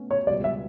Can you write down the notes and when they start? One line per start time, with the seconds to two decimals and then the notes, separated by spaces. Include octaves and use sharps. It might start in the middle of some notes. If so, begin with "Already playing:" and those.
Already playing: B2 A3 C#4
0.11 C#5
0.27 C#2 B2 G3 D5
0.44 E5